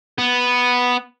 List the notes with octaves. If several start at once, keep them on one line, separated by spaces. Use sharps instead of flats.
B3